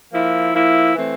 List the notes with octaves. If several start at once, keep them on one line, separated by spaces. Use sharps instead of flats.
F3 A#3 E4
F3 A#3 E4
E3 A3 C4